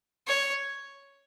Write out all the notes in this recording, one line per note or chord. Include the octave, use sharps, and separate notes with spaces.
C#5